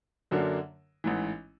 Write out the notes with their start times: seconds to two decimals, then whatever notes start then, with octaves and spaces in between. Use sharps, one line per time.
0.31 F#2 D3 F#3 A#3 D4
1.04 A1 G#2 E3